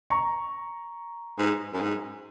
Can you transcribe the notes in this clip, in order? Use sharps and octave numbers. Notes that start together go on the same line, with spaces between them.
A#5 C#6
G#2
F#2
G#2